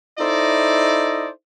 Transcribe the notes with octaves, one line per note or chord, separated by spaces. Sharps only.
D#4 E4 A4 C5 D5 D#5